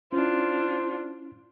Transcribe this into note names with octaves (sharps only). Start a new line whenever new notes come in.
C#4 D4 E4 F4 C5